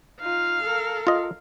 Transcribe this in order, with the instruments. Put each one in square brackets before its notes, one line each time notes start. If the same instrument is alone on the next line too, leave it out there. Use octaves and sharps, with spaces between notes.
[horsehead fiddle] D#4 F4 [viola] F5
[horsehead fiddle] A4 A#4
[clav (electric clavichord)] F4 D#5